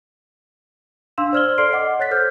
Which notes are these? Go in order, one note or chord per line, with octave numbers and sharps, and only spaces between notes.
D4 F5 C6 E6 E7
C5 D5 F6 G#6 F#7 G7
A4 D5 C6 F6 C7 D7
D#5 F#5 D6
C#5 F#6 A6 B6
A4 C5 F6 G6